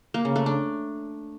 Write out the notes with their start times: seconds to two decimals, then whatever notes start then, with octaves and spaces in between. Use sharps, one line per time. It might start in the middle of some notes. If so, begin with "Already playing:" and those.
0.14 A#3
0.25 C#3
0.36 A3
0.46 D4